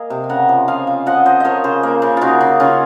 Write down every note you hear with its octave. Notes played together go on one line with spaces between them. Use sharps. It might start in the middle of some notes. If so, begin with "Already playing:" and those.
Already playing: A#3 G#4 A#4 D#5
C3
G#5
C#3 F#5 A#5
F3
F3 F5 G#5
F3
F3 D#5 F#5
F3 C5 D#5
F3 A#4 C#5 D#5
C#3 G#4 C5
A#3
C#3
C#3 D#4 F4 F#4
C#3
C#3 C#4 F4